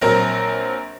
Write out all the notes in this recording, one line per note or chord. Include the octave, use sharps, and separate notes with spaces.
A#1 F#3 C4 A#4 A#5